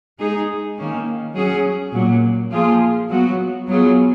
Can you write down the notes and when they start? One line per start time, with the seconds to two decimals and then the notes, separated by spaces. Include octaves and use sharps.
0.18 G#3 D#4 G#4
0.76 D#3 A#3 C#4
1.34 F#3 C#4 G#4
1.93 A#2 F#3 A#3
2.51 F3 A#3 F4 G#4
3.09 F#3 B3 F#4
3.67 F#3 B3 F4 G#4